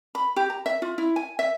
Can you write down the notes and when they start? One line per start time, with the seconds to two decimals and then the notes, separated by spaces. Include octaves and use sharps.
0.15 B5
0.36 G4
0.50 A#5
0.66 E5
0.82 F4
0.98 E4
1.16 G#5
1.39 E5